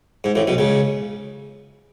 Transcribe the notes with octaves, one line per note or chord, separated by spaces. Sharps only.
G#2
A1 A2
B1 B2
C#2 C#3